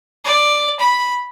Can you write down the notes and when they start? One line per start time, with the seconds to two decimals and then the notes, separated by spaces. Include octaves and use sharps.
0.25 D5
0.79 B5